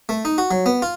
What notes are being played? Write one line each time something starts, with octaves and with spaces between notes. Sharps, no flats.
A3
D#4
F#4
F#3
B3
F4